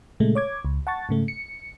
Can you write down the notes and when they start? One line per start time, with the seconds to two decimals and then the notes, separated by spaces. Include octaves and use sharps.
0.20 A#2 C#3 G#3 A3
0.35 C#5 D6 G#6
0.65 C#2
0.87 F#5 A5 C#6 A6
1.09 G#2 C#3 A3
1.28 C#7